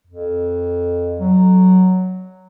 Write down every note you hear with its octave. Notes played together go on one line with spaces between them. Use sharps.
F2
F#3